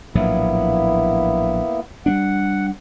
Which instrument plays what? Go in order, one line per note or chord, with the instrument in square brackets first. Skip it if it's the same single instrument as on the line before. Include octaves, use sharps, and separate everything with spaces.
[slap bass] A#1 A2 F#3 [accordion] A#3 B3 E4
[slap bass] G3 A#3 D4 [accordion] F#5